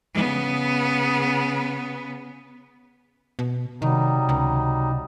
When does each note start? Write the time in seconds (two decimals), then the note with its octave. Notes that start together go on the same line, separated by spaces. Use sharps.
0.14 C#3 B3
3.39 B2
3.82 C3 D#3 F#3 G3 D#4
4.29 C#2